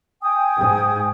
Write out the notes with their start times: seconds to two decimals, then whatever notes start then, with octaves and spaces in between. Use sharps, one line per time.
0.22 G5 G#5 D#6
0.59 G#2